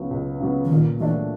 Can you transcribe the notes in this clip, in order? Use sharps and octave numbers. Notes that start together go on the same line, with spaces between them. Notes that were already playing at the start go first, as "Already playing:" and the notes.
Already playing: C#2 C#3 F#3 B3
C#2
C#3 F#3 B3
E3
A#2 D#3
E3 F#3 A3 D4